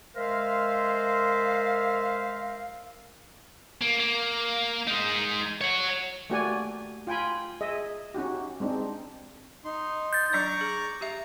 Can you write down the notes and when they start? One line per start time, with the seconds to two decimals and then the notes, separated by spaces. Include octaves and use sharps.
0.16 G#3 A#4 C5 E5 F5
3.81 A#3
4.00 A#3
4.87 G#3 D#4
5.61 C#5 F#5
6.30 A3 A#3 F#4 G4 D5 G#5
7.07 F4 G5 G#5 B5
7.61 G#4 D#5 E5
8.15 C#4 D#4 F#4 G4
8.60 G#3 C4 D4 D#4
9.65 D#4 C6
10.13 G6 A6
10.33 F#3 D4 D5 A#5 C#6 D6
10.61 G#4
11.01 G4 E5 A#5